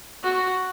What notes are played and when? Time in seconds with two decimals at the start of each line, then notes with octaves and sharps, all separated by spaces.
0.23 F#4